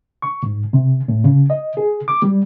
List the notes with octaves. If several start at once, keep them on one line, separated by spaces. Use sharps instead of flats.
C#6
G#2
C3
A2
C#3
D#5
G#4
D6
G3